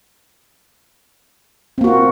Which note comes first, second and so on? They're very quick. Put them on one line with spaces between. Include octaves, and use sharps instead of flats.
C4 A#3 F#4 F4